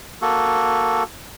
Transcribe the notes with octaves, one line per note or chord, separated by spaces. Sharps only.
A#3 F#4 A4